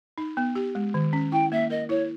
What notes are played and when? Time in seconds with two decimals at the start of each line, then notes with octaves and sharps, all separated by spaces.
0.18 D#4
0.37 B3
0.55 G4
0.75 G#3
0.94 D#3
1.13 C#4
1.32 E4 G5
1.52 A#3 E5
1.70 A#4 D#5
1.89 E4 C#5